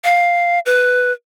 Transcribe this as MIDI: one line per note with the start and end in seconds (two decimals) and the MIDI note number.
0.04 0.59 77
0.66 1.12 71